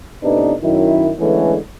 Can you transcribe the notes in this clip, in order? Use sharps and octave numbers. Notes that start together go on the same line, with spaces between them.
A2 C3 B3 D4 D#4 B4
F#2 D#3 E4
D3 E3 G#3 A3 B3 C#4